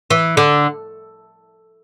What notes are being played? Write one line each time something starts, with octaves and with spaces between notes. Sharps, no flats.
E3
D3